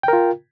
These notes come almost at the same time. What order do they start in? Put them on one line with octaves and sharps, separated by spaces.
G5 A#4 F4